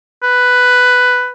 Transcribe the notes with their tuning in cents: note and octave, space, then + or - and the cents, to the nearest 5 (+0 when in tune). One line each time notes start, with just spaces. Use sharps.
B4 +5